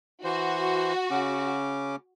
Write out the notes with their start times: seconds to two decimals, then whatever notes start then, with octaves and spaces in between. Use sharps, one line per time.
0.24 E3 F#4 C5
1.11 C#3 C#4 D6